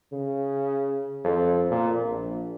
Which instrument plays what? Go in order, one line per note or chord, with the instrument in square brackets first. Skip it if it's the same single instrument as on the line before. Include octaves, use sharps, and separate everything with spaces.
[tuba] C#3
F2
A#2
A#1